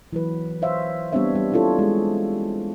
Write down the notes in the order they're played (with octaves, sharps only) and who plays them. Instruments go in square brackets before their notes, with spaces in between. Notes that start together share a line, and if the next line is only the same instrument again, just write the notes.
[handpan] E3 F#3 B4
C5 C#5 E5 F5
G3 B3 C4 D4 C#5 E5
G3
D4 E4 F4 G4 A4 C#5
G#3 G#4